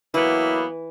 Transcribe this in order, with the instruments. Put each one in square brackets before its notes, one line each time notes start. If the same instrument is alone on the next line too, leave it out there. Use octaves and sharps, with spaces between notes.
[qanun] E3 [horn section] F#3 A#3 B3 [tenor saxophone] E4